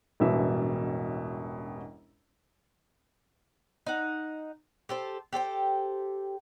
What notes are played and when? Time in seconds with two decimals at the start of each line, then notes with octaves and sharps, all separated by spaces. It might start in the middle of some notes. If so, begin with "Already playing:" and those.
0.20 E1 A1 G2 B2 E3 E5
3.86 D#4 F#5
4.89 G4 A4 C5
5.33 G4 A4 C5 G5